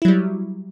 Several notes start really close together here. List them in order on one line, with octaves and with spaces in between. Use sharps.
E4 F#3 G3